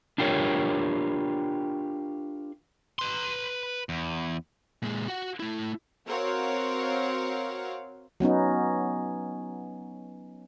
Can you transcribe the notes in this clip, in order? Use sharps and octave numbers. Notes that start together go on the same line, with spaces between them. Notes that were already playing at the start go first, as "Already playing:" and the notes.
D4 F4 G4 A#4 C#5
B4 C6
E2
A#2 G#3
F#4 F#5
A3 E4
C4 F#4 A#4 C#5 F5 F#5
F#3 B3 C#4 D#4